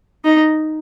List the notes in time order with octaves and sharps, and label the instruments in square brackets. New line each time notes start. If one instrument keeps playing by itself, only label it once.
[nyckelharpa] D#4